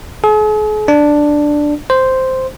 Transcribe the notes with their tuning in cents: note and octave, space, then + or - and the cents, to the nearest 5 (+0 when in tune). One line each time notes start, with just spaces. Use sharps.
G#4 +45
D4 +5
C5 -5